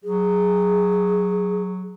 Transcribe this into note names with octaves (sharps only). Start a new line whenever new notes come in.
F#3 G#4